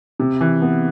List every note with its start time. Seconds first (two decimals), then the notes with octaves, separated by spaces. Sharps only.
0.20 C3
0.41 E3
0.62 B3